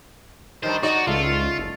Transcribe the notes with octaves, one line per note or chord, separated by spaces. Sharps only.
D#3 G3 D4 C5
D#4 F#4 D5
C#2 A3 F4
F#1